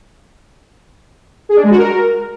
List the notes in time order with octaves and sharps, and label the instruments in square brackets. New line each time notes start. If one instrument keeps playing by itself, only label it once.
[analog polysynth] G#4
D4
G#3
F#4
A#4